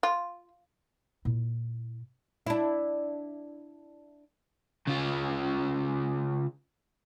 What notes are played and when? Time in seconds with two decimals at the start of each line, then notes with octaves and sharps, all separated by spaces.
0.03 F4
1.25 A#2 E4
2.47 D4 E4
4.87 C#3 F4